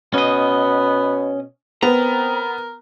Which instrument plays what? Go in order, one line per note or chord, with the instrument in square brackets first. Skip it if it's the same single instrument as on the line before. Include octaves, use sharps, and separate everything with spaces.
[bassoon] B2 [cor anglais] B3 [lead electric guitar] C#4 D#5
[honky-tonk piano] B3 [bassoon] C4 [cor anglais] A#4 [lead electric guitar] A#5